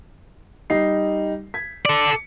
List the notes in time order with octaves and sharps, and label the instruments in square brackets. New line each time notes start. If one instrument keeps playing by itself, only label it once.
[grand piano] G3 D#4 C7
G#6 B6
[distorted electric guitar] A4 D5